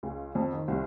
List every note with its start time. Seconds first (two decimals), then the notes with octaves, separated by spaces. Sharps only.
0.03 C#2
0.35 F2
0.53 D#3
0.68 C2